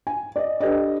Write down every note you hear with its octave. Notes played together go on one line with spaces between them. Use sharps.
G#5
D5 D#5
D4 G4 A4 B4 D5 D#5